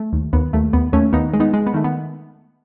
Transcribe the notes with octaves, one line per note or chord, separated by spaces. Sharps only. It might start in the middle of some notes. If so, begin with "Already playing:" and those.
Already playing: A3
D#2
D#2 B3
D#2 A3
D#2 B3
D#2 A3 C#4
D#2 B3 D#4
G#3
B3 D#4
G#3
B3
D#3 A3
B3